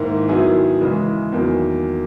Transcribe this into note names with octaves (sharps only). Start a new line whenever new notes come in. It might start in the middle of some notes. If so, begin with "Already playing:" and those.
Already playing: G#2 D#3 A#3 E4
D#3 F#3 B3 E4 G#4
C#3 E3 G#3
E2 D#3 F#3 A#3